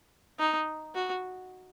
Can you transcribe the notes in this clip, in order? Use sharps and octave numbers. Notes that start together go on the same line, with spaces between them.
D#4
F#4